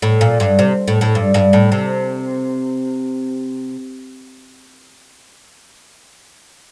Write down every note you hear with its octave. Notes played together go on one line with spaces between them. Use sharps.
A2
A#2
G2
C3
A2
A2
G2
G2
A2
C3